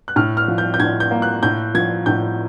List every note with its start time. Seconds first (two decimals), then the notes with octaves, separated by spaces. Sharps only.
0.08 F#6
0.16 A2 F6
0.37 F6
0.48 F3
0.58 G6
0.74 G6
0.80 A2 G#6
1.00 G6
1.11 A#3
1.22 F#6
1.43 A2 G6
1.74 F3 G#6
2.06 A2 G6